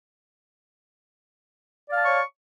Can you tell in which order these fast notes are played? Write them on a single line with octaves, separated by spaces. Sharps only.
D5 F5 A5 C#6 C#5